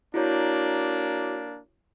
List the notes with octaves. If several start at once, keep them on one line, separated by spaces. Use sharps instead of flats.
A#3 D4 E4 F#4 C#5